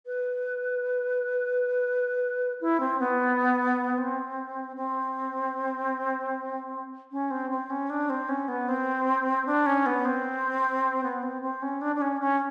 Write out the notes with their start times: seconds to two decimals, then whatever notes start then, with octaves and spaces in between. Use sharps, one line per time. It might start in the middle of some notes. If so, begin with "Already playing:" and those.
0.06 B4
2.61 E4
2.80 C4
3.00 B3
3.98 C4
4.76 C4
7.12 C#4
7.31 C4
7.50 C4
7.70 C#4
7.90 D4
8.10 C4
8.29 C#4
8.48 B3
8.69 C4
9.46 D4
9.66 C#4
9.86 B3
10.05 C4
11.03 B3
11.23 C4
11.42 C4
11.62 C#4
11.82 D4
11.96 D4
12.02 C#4
12.21 C#4